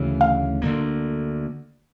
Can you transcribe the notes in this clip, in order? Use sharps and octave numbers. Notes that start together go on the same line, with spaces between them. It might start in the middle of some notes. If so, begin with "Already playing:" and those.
Already playing: D2 C#3 E3 A3
F5
D2 D3 F#3 A#3